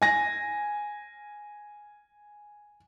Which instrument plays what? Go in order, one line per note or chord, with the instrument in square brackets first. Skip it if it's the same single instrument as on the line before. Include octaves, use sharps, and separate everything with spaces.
[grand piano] G#5 A#6